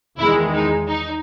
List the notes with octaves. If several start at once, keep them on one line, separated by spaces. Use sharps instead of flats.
E2 D#3 G#3 E4
D#4
D#4